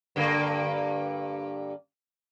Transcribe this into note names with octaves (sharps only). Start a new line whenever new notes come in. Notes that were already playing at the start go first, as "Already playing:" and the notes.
G2 D3 A#3